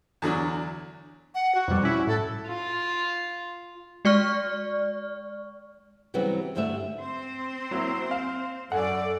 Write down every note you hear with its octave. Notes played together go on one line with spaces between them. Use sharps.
E2 D3 F#3 D4
F#5
F#4
F2 B2 G3
C#4 E4
A2 A4
F4
G#3 D5 C#6 F6
C#3 E3 F#3 G3 B3 C4
D2 G2 D3 G3 A3 E5
C4 C5
F#3 A#3 E4
F5
F#2 A4 D5 F#5 G#5